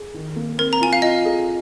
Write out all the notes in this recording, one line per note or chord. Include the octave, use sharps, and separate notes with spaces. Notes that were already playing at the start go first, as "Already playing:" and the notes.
Already playing: G#4
D#3
A#3
C4 A#4
A#5
F4 G#5
F5
F4 D#5
G#4